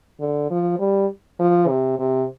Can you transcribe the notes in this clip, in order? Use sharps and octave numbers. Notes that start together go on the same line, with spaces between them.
D3
F3
G3
F3
C3
C3